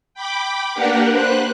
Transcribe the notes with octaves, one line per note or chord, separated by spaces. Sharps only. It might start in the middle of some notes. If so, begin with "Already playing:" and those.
G5 B5 D6
A#3 D4 G4 A#4 B4 F#5
B4 C5 F#6